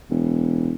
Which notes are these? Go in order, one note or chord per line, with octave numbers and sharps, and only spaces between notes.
E1